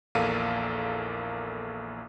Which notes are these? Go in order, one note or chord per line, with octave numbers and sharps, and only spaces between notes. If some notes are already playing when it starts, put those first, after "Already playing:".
A#1 E2 A#3 A4 F5 D#7